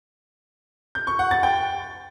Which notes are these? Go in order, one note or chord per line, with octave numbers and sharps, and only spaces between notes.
G6
C#6
F#5
A6
G5